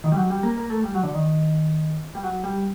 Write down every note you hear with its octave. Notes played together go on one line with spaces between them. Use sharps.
D#3
G3
F#3
G3
A#3
A#3
A3
G3
F#3
D3
D#3
G3
F#3
G3